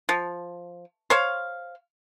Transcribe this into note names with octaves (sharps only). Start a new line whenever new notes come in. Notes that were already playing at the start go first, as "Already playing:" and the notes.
F3
C5 C#5 F5